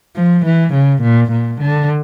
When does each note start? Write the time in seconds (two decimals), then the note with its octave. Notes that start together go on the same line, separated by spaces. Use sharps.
0.16 F3
0.46 E3
0.74 C#3
1.03 A#2
1.32 A#2
1.61 D3